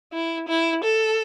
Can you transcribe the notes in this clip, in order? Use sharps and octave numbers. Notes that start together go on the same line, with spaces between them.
E4
E4
A4